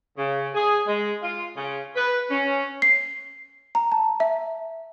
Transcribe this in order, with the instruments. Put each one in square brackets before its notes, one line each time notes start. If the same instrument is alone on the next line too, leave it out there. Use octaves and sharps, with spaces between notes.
[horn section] C#3
G#4
G#3
F4
C#3
B4
C#4
[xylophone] C7
A#5
A5
E5